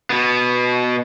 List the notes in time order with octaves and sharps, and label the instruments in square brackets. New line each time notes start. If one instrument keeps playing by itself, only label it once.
[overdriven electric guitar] B2 B3